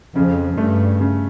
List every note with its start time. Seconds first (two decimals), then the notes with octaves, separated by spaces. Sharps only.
0.16 F2 C#3
0.58 G2 A3
1.00 C#3